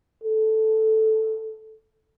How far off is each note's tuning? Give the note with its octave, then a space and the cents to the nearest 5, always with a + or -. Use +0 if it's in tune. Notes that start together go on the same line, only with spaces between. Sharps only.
A4 -5